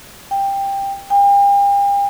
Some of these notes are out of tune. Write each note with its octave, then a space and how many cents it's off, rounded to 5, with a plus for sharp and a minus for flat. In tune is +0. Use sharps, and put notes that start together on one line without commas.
G5 +10
G5 +40